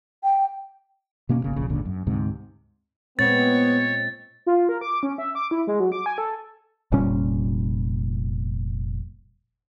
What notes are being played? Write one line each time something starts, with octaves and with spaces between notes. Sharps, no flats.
G5
B2 A#3 C#4
G#1 C#3 A#3
D#1 A#1 C#3
G#1 D#2 A#2 D3
F#2
D2 G#2 C3
A#2 G#3 B3 C4 C#5 A6
F4
A#4
D6
C#4
E5
D6
E4
G#3
F#3
D6
G#5
A4
F1 A#2 G3 C#4